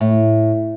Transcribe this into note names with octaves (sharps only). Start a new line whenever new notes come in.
A2